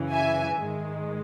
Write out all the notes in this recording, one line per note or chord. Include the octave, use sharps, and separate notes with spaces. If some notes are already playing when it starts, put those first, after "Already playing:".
Already playing: F#2 C#3 E3
E5 G#5
G#2 D#3 G#3